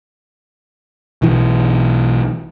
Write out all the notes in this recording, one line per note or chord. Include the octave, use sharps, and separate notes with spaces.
B1 E3